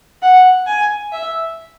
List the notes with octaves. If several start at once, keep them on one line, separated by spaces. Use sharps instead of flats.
F#5
G#5
E5